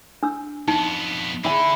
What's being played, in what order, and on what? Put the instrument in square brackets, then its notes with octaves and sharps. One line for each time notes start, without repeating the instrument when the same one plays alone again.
[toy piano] D4 E6
[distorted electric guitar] F2 B3 [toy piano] D#4
[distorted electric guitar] D3 [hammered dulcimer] E4 G#5